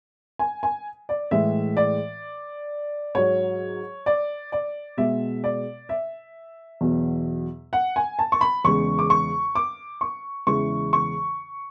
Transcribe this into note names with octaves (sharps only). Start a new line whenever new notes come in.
G#5
G#5
D5
A2 E3 G#3 E5
D5
G#2 F#3 C#5
D5
D5
B2 G#3 E5
D5
E5
E2 B2 F#3
F#5
G#5
A5
C#6
B5
E2 C#3 G#3 C#6
D6
C#6
D6
C#6
E2 C#3 E3 G#3 C#6
C#6